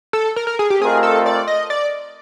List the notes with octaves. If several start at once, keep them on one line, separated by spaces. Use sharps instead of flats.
A4
A#4
A#4
G#4
G4
A3 C4 F4 G#4 A#4 D#5
A4
D5
D#5
D5